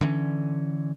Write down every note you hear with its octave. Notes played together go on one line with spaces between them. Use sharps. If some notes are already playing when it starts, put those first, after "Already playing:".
D3 E3 G3 C#4